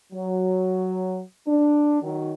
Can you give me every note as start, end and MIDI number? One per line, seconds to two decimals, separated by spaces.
0.12 1.20 54
1.47 2.01 62
2.02 2.31 51
2.02 2.31 54